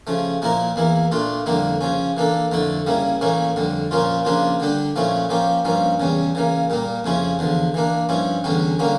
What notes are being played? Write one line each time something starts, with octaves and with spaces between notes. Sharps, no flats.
C#3 F3 A3
A#2 F3 A#3 E4 A#4
E2 E3 A#3 E4
A#2 A3 D4 F4
F2 D3 G3 A#3 E4
C#3 F3 C#4
E3 A#3 D4 A4
F2 D3 A3 E4 A4
C#3 G3 A#3 E4
A2 E3 A#3 C#4 E4
F2 D3 G3
A#2 F3 A#3 C#4 F4
C#3 F3 A#3 D4 F4
D3 G3 D4 G4
A#2 F3 A3 C#4 E4
F3 A#3 C#4 G4
G2 F3 A#3 C#4
E2 C#3 G3 C#4
C#3 E3 A#3
A#2 G3 A#3
F2 C#3 F3 C#4 E4
E2 D3 F3
E3 A#3 D4
G2 F3 C#4 E4
E2 D3 G3 C#4
D3 G3 A#3 C#4